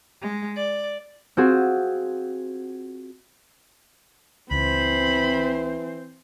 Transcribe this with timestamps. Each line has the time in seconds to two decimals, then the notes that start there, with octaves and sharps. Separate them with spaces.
0.22 G#3
0.56 D5
1.37 C4 F4 F#4 G#4
4.51 C#2 E3 C4 C5 B5